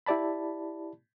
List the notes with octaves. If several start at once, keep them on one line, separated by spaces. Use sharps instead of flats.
E4 G4 D5 A5 B5